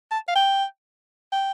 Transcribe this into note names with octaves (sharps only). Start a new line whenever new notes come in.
A5
F5
G5
G5